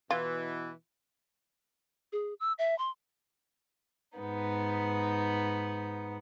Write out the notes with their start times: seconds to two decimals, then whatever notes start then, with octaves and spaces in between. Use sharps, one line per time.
0.11 B2 E3 F4
2.12 G#4
2.40 E6
2.59 E5
2.78 C6
4.18 G#2 B3 D#4